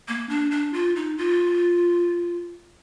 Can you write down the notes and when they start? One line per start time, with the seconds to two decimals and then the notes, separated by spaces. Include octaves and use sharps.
0.08 A#3
0.29 D4
0.51 D4
0.73 F4
0.96 D#4
1.18 F4